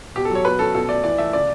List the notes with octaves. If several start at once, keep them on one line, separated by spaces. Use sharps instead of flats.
B2 G4
A4
F#3
C#5
B2 B4
C#4 A4
B2 A4
A3 D5
E3 D5
A3 E5
C#3 D5